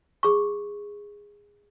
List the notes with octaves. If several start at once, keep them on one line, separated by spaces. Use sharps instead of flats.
G#4 C#6